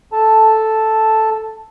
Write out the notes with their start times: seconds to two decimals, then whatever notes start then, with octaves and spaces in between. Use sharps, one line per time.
0.13 A4 A5